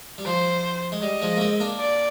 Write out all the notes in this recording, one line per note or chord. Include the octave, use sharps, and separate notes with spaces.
G3
F3 C5
G#3
G3 D#5
F3 G#3
A#3
G#3 C4
A#3 D4
D5